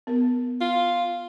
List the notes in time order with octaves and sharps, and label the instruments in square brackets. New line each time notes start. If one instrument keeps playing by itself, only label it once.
[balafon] B3 A#4
[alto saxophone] F4